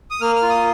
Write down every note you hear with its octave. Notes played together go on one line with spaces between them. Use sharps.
D#6
A#3 F6
F6
F4
D#6